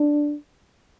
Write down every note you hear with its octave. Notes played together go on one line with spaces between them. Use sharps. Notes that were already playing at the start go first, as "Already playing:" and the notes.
Already playing: D4